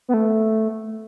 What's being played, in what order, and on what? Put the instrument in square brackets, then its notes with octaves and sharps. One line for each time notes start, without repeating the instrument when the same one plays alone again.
[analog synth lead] B3
A3